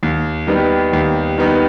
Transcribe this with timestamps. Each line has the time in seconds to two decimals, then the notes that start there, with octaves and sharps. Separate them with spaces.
0.03 D#2
0.47 D#3 G3 B3 D#4
0.93 D#2
1.38 D#3 G3 B3 D#4